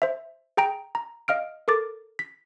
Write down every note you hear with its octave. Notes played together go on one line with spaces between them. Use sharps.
C5 E5
G#4 G5 A#5 D7
A#5
D#5 F5 F6 D7
A4 A#4 D6 A6
B6